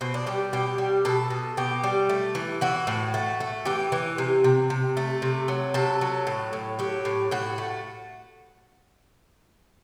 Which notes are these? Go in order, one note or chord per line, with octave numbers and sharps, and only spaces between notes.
B2 C4
D4
G3 G4
B2 G4
G3
B2 A4
B2
B2 G4
G3
A3
E3
E3 F#4
A2
A3
A3
E3 G4
E3
C3
C3
C3
A3
C3
F#3
C3 A4
F#3
A2
A2
F#3 G4
A2
A2 F#4
A3